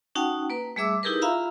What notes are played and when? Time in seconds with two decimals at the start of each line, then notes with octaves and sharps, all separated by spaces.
0.15 C#4 D#4 F#4 F#5 G5 A5
0.50 A#3 B4
0.76 G3 A3 G#4 E5 D6 E6
1.03 D#4 E4 G4 G#4 A#4 B4
1.21 F4 E5 F5 A#5 B5 E6